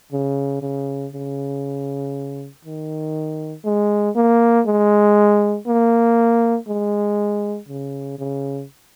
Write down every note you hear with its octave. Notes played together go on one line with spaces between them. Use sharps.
C#3
C#3
C#3
D#3
G#3
A#3
G#3
A#3
G#3
C#3
C#3